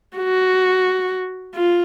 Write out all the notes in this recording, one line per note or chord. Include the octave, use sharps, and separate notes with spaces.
F#4
F4